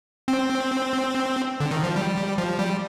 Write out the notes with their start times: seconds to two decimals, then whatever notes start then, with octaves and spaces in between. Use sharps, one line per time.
0.28 C4
1.60 D3
1.71 D#3
1.83 F3
1.96 G3
2.38 F3
2.59 G3